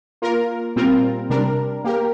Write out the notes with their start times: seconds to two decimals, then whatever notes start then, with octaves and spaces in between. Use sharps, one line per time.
0.22 A#3 F4 A#4
0.76 A#2 G3 C4 F4 A#4
1.30 C3 G3 D4 A#4
1.84 A#3 G4 A#4